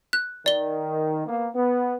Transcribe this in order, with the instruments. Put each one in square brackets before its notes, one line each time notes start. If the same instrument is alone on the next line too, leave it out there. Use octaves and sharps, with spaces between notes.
[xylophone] F#6
[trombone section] D#3 [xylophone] D5 G7
[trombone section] A#3 B3
B3